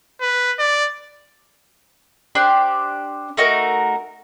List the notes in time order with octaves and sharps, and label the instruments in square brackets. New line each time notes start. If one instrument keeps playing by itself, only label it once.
[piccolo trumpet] B4
D5
[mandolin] D4 G4 C5 D5
A3 D#4 F#4 A#4